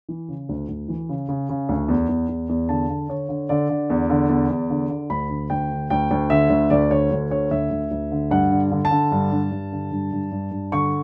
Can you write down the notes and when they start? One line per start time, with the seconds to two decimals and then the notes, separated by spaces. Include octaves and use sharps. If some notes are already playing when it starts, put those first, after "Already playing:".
0.09 E3
0.29 C#3
0.49 D2
0.68 D2
0.88 E3
1.09 C#3
1.29 C#3
1.49 C#3
1.69 D2
1.88 E2
2.09 E2
2.28 E2
2.49 E2
2.69 D3 A5
2.89 D3
3.09 D3 C#5
3.29 D3
3.49 D3 D5
3.69 D3
3.90 E2
4.10 D3
4.29 E2
4.50 E2
4.70 D3
4.90 D3
5.10 D2 B5
5.30 D3
5.50 D2 G5
5.71 D3
5.90 D2 G5
6.11 D2
6.30 D3 E5
6.50 D2
6.70 D2 D5
6.90 D3 C#5
7.11 D2
7.30 D3 C#5
7.51 D2 E5
7.70 D2
7.91 D2
8.11 D3
8.31 G2 F#5
8.51 D3
8.72 D3
8.85 A5
8.91 D3
9.12 G2
9.32 G2
9.51 G2
9.72 D3
9.91 G2
10.12 G2
10.32 G2
10.51 G2
10.72 D3 C#6